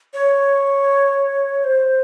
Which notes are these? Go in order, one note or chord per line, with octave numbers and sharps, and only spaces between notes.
C#5
C5